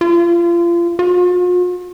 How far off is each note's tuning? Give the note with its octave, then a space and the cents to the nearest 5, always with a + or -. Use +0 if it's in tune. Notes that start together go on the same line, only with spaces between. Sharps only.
F4 -30
F4 +45